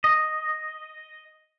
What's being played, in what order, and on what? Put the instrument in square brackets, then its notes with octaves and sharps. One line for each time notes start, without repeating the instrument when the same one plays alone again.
[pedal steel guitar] D#5